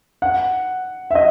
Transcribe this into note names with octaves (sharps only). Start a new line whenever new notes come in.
F#5
E5
D#5